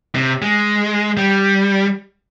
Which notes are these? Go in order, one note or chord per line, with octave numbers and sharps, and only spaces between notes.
C3
G#3
G3